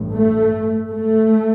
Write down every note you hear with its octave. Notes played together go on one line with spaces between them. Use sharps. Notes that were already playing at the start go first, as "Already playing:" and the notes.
Already playing: A1 G2
A3
A3